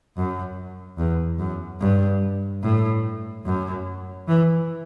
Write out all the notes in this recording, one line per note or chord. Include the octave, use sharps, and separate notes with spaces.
F#2
E2
F#2
G2
A2
F#2
E3